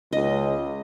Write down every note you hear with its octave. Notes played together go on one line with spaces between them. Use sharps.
C#2 D#5